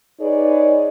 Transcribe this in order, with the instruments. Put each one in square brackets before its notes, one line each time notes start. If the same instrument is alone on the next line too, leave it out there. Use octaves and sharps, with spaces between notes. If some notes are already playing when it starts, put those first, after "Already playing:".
[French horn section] D#4 G#4 B4 C#5 D5